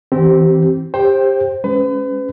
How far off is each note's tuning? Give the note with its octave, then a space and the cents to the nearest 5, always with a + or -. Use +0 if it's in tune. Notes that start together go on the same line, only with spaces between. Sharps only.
E3 -25 C4 +5 G4 -25
G4 +20 C5 +20 G5 +0
G#3 +0 C#4 +0 B4 +40